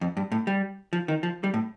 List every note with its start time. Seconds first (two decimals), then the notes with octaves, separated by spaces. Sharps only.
0.01 F2
0.17 G2
0.32 A2
0.47 G3
0.93 F3
1.08 D#3
1.23 F3
1.44 G3
1.54 A2